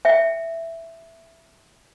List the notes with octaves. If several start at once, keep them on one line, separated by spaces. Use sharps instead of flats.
E5 G5